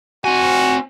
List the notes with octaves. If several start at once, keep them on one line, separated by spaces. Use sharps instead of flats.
C4 F#4 G#5